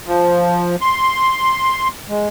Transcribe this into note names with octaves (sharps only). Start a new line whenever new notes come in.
F3
C6
G#3